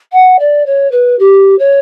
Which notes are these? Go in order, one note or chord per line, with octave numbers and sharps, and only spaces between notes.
F#5
D5
C#5
B4
G4
C#5